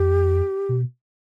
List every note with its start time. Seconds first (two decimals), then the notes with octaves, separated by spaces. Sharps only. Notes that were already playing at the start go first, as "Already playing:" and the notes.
Already playing: F2 G4
0.69 B2